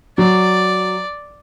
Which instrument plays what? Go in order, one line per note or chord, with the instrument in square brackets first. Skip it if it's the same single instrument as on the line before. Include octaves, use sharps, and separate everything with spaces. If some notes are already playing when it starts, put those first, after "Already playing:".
[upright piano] F#3 [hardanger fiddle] D5